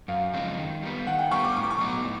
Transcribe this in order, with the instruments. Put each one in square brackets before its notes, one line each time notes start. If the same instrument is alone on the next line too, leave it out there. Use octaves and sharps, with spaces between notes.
[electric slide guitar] F#2 [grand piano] F5
[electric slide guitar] C#3 F3 G#3 C4
D#3
G3 B3
[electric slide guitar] D#3 [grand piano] F#5
[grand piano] G5
[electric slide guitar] G3 B3 [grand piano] C#6
[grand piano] D6
[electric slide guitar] A2 [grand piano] C#6
[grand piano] D6
C#6
[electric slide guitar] F#3 B3 D#4
A2